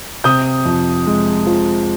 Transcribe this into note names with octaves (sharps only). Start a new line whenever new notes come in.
C3 D#6 G6
F2
G#3
F3